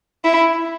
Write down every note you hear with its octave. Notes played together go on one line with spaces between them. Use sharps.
E4